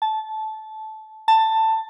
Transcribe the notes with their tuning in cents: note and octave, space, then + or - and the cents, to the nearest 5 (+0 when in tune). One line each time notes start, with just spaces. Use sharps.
A5 -15
A5 +15